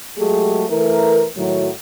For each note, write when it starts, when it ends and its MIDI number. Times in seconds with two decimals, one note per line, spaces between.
0.17 0.63 54
0.17 0.63 56
0.17 0.63 57
0.17 0.63 67
0.17 0.63 68
0.70 1.24 52
0.70 1.24 57
0.70 1.24 70
1.36 1.68 45
1.36 1.68 51
1.36 1.68 54